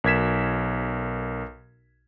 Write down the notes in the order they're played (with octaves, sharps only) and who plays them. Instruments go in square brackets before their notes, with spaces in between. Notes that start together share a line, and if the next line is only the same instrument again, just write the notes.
[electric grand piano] B1 A#4 G#6 B6 E7